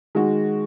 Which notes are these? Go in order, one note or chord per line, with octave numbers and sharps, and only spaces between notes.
D#3 G#3 F#4